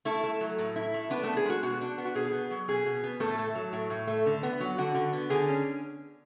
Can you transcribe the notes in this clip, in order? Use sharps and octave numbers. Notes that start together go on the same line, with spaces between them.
A3 E4 A4
A3
F#3
A2
E4
A3
B3 D4 B4
A3 A4
B3
G#4
G#3 F#4
B2 F#4
D4
B3
F#4
B2 G#4
B3
F#3
B2 G#4
B2
B3
A2 A3 A4
A3
F#3
A2
A2
A3
D3
B3
F#3
D3 F#4
D3
B3
D3 G#4
C#4